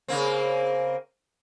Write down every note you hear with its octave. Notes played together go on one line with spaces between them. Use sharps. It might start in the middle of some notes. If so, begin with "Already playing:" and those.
C#3 A#3 C4